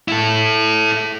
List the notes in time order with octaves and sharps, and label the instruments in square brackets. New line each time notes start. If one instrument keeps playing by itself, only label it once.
[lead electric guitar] E4 A4